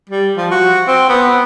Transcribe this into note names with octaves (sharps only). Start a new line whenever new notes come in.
G3
F3
F#4
C4
B3